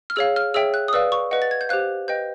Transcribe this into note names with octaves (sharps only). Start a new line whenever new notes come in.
F6
G#4 C#5 F5 E6
F6
G#4 C#5 E5 G5 E6
F#6
D#6
B4 D5 F5 E6
C#6
B4 D#5 F#5
A6
G#6
G6
G4 C5 F5 F#6
B4 D#5 G5 G6